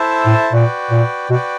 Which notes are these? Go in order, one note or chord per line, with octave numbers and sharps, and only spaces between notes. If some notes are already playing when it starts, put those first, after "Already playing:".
Already playing: E4 A4 C5 E5 A5
A2
A#2 F#4 B4 D5 G5
A#2
B2 F#4 B4 D5 G5